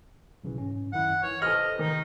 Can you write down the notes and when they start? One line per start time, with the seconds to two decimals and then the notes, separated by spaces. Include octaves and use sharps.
0.44 B1 C#3 E3
0.58 G#2 C#4
0.92 F#2 D#3 E4 F#5
1.23 E3 C#5 F6
1.42 G4 A4 B4 C5 D#5 F6
1.79 D#3 D#4